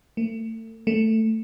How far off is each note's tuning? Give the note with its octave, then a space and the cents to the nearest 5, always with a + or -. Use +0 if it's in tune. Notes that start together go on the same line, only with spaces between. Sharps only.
A3 +35
A3 +10